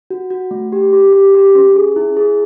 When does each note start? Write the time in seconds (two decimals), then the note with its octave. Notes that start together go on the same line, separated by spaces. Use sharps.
0.10 F#4
0.30 F#4
0.51 A3
0.72 G4
0.93 G4
1.13 G4
1.35 G4
1.55 C#4
1.76 G#4
1.96 E4
2.17 G#4